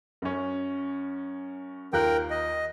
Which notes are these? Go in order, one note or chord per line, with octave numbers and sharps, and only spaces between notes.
F#2 C#4
D#2 F4 A#4 G5 F#6
D#5